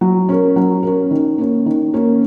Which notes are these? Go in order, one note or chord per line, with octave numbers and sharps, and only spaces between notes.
F#3
C#4 A#4
F#3
C#4 A#4
D#3
A#3 C#4
D#3
A#3 C#4